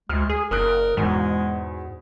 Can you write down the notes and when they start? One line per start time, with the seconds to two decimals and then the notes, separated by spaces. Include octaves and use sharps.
0.09 D2 G#3 F6
0.29 G#4 G#5
0.51 F#1 A#4 D#6 F#6 D7
0.97 E2 G#2 B2 G#3